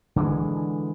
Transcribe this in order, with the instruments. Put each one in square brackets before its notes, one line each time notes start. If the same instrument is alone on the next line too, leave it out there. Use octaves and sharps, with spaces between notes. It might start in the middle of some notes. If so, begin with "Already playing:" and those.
[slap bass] D3 E3 G#3